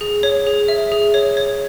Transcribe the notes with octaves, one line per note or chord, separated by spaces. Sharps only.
G#4
C#5
G#4
E5
G#4
C#5
C#5